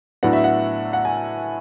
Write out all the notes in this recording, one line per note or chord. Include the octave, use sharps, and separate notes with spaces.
A2 F#3 B3 D4 F#5
E5
F#5
F#5
G#5